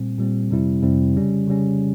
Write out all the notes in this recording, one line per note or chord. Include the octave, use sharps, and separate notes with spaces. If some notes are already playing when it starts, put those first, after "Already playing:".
Already playing: A#2 G3 C4
A#2 G3 C4
F2 C3 G3 C4 E4
F2 C3 G3 C4 E4
C#3 G3 C#4
C#3 G3 C#4